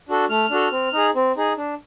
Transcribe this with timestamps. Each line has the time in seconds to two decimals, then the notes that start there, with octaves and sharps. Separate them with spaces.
0.09 D4 F#4 A4
0.29 A3 F6
0.50 D4 F#4 A4
0.72 C4
0.93 D#4 G#4
1.15 C4
1.37 D#4 G#4
1.57 D4